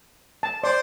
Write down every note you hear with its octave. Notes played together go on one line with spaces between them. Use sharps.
A5
C5 D5